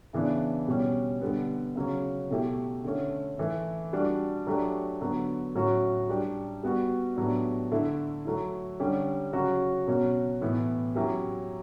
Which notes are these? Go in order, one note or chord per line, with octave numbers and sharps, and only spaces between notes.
C#3 E3 B3 D4
B2 G3 C#4 G4
D3 G3 B3
C#3 F#3 C#4
B2 A3 E4 G4
D3 A3 C#4
E3 A3 E4
G3 D4 F#4
F#3 A3 D4 G4
D3 F#3 B3
A2 F#3 C#4 F#4
G3 D4 G4
G3 B3 F#4
A2 F#3 B3 D4 G4
D3 A3 E4
F#3 A3 E4
D3 G3 C#4 G4
C#3 F#3 C#4 F#4
B2 F#3 C#4 F#4
A2 E3 B3 E4
F#3 C#4 E4 G4